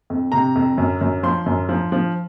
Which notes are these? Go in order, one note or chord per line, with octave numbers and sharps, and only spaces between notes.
F2
C3 A#5
F2
F#2
F#2
F3 C6
F#2
F3
F3